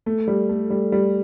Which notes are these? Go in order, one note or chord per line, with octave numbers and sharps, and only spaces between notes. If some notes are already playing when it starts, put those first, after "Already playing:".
A3
G3
A3
G3
G3